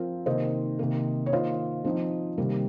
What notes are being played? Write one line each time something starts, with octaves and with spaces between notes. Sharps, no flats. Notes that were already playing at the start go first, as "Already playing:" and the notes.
Already playing: F3 C4 F4 A#4
C3 D#3 A#3 D#4 C5 D#5
C3 D#3 A#3
C#5
D#3 A#3 F4 C5 D#5
F3 C4 D#4
C3 D#3 G3 A#3